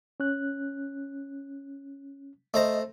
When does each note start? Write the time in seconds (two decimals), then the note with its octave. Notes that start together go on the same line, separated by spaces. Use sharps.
0.20 C#4 F#6
2.54 A3 C5 D#5 A#5